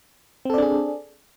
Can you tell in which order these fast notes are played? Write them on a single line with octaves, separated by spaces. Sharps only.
C4 A4 D5 D4 G#4